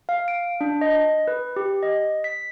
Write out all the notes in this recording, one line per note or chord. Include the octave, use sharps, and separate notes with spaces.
F5
D7
D4
D#5
B4
G4
D#5
B6